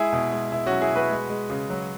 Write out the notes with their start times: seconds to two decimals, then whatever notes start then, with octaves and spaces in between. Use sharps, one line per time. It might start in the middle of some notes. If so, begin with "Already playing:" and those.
Already playing: G#3 E4 G#4
0.13 B2
0.33 G#3
0.52 B2 E4
0.66 F#3 C#4 F#4
0.81 E4 G#4
0.91 B2
0.96 F#4 B4
1.11 G#3
1.30 G#3
1.50 C#3
1.70 F#3